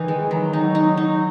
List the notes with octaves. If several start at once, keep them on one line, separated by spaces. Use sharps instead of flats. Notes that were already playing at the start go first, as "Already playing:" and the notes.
Already playing: D#3 E3 D#4
G#3
D#3 F#3
F#3 D#4
D#4
D#4